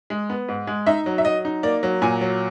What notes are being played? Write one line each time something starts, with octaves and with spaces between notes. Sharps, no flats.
G#3
B3
G#2
G#3
D#4 E5
F#3
E5
F#3 D#5
D#4
A#3 D5
F#3
A#2 G#5
F#3